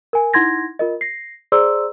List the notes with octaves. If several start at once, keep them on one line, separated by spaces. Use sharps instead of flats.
A#4 G#5
D#4 E4 F#5 C6 G#6 A#6
F4 A#4 D#5
A#6 C7
G#4 C5 D5 A#5 C6 E6